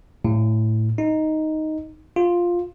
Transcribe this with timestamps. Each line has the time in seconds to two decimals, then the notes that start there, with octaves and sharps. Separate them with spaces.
0.25 A2
0.98 D#4
2.16 F4